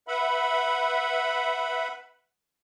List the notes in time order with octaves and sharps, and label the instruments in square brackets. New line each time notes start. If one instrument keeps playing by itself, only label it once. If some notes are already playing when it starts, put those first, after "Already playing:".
[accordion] B4 E5 F#5 B5